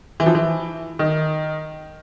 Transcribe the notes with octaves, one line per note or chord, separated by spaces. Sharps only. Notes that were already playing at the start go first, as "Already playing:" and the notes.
E3
F3
E3
D#3